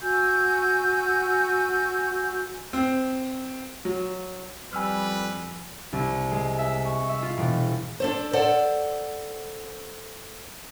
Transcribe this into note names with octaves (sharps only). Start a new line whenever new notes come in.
F#4 G#5 E6 G6
C4
F#3
F2 G3 B4 G#5 E6 F6
C2
G#3
E5
C#6
E5
F4
E1
D4 A4 C5
A4 C5 D5 F#5